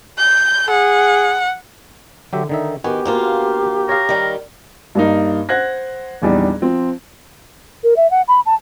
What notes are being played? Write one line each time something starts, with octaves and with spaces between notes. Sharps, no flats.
G6
G#4 F#5
D3 F#3 G4 E5
D3 D#3 D#4 E5
D#3 B3 F#4 G4 G#5
D2 A#3 F4
A#4 C#5 F5
D#3 G3
G2 A#3 D#4
C5 F#5 F#6 G#6 A#6
A#1 E2 G3 D4 D#4
F3 C4
A#4
E5
F#5
B5
A5